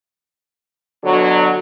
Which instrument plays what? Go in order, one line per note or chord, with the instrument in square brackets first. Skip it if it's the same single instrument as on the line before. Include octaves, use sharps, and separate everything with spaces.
[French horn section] B2 D3 F#3